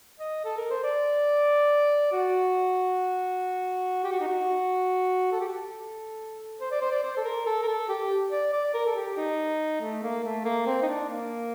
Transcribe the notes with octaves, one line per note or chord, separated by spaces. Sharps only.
D#5
A4
A#4
C5
D5
F#4
G4
F#4
D#4
F#4
A4
G4
A4
C5
D5
C5
D5
C5
A4
A#4
A4
A#4
A4
G4
D5
D5
A#4
A4
G4
D#4
A3
A#3
A3
A#3
C4
D#4
D4
A#3